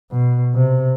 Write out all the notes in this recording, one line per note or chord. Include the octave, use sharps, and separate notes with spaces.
B2
C3